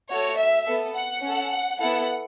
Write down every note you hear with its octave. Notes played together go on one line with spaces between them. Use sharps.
A3 F#4 A4 C#5
E5
B3 A4
F#5
C#4 A4
B3 E4 A4 F#5